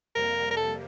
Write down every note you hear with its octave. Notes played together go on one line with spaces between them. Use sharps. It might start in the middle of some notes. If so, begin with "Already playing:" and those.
F2 C3 G3 A#3 A#4
A#4
A4